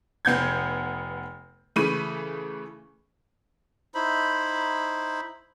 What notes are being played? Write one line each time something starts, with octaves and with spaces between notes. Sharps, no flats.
F1 B3 G6 G#6
C#3 E3 A3 B5 D#7
D#4 E4 C5 B5